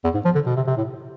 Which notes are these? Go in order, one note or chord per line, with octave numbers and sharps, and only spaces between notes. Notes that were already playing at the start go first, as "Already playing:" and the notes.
E2
G#2
F3
D3
B2
C3
C3
A2